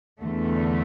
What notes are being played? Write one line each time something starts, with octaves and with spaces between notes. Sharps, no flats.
E2 D3 A3